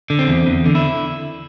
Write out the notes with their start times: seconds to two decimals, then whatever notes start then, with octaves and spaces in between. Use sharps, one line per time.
0.10 D3
0.19 C4
0.28 E2
0.47 E2
0.66 D3
0.75 E4